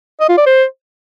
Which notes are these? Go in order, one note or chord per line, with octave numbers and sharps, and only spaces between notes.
D#5
F4
D5
C5